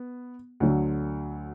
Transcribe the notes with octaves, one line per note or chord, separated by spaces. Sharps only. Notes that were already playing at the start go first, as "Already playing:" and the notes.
Already playing: B3
D2 D3 F#3